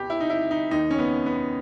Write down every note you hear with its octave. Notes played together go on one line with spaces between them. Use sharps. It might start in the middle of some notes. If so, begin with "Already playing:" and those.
Already playing: C#2 B2 G4
E4
D#4
E4
D#4
D#2 D#3 D#4
C#4
B3
B3